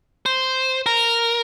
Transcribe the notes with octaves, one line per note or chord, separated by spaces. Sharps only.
C5
A#4